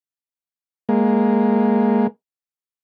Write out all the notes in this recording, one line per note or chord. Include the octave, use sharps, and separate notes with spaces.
G#3 A#3